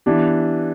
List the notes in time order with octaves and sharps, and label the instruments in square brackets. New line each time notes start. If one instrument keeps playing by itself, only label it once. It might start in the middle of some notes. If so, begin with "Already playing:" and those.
[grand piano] E3 B3 D4 G4